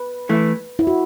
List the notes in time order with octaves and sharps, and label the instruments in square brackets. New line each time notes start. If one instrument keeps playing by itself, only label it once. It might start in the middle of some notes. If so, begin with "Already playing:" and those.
Already playing: [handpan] B4
[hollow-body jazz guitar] E3 A3 E4
[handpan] E4
F#4